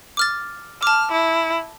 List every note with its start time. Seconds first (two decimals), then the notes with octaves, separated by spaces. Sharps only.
0.17 D6 F6 A6
0.83 A5 D6 F6
1.12 E4